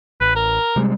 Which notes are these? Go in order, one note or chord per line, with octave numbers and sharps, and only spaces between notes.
A1 B4
A#4
C3 G3 G#3